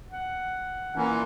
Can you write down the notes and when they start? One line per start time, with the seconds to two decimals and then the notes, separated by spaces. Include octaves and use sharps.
0.11 F#5
0.96 A#2 E3 C#4